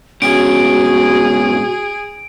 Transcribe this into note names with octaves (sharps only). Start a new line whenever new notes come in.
G#2 B2 C#4 F#4 G#4 D7